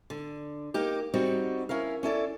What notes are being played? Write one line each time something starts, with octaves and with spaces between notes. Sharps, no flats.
D3
A#3 D#4 G4
G3 C4 D#4 F#4
C#4 E4 A#4 F5
C#4 E4 A4 D5